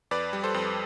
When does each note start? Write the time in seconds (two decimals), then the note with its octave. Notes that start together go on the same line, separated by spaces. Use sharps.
0.11 F2 B4 D5
0.33 G3
0.44 A4 C5
0.54 F2